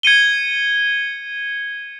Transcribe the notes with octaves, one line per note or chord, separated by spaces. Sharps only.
G#6 C#7 D#7 G7